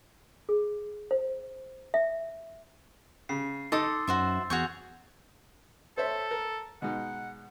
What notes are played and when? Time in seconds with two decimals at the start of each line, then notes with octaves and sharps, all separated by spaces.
0.49 G#4
1.11 C5
1.94 E5
3.29 C#3 C7
3.72 D#4 A4 C6 D6 E6 A6
4.07 F#2 F#4 C5 E5
4.50 E2 F#4 G#4 C#6 G6 F7
5.97 A4 C5 C#5 E5
6.31 A#4
6.82 B2 G#3 D#4 F#5